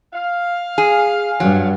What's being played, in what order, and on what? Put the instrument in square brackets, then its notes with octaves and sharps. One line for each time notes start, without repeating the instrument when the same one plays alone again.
[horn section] F5
[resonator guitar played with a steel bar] G#4
[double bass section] G2 [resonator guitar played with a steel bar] F#3